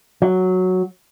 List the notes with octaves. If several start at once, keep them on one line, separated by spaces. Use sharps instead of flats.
F#3